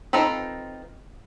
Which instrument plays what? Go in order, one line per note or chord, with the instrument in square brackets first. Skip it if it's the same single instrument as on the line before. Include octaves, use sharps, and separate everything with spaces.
[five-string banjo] C4 D#4 F4 A4 B4